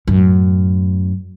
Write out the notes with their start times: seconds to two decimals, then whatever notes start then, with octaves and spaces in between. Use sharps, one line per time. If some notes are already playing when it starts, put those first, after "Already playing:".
0.08 F#2 A2